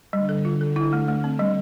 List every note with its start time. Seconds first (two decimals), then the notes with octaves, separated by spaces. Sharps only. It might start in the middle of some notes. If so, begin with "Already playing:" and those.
0.13 D3 G3
0.29 A4
0.45 F4
0.61 A4
0.76 E4
0.93 A3
1.08 A3
1.24 C4
1.39 G3